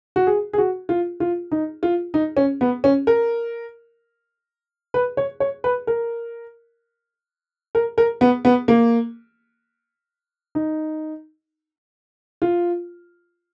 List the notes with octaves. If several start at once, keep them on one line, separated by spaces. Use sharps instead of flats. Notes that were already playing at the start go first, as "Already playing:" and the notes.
F#4
G#4
G#4
F#4
F4
F4
D#4
F4
D#4
C#4
B3
C#4
A#4
B4
C#5
C#5
B4
A#4
A#4
A#4
B3
B3
A#3
D#4
F4